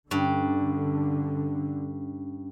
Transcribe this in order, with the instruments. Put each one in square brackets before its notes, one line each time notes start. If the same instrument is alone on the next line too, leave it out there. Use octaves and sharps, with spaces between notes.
[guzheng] G2 [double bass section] D3 [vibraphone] C#4